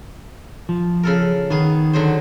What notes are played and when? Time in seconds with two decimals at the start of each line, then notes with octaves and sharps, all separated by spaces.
0.69 F3
1.03 C#3 A4 A#4
1.50 D#3 B3 G#4
1.93 D3 F#3 C5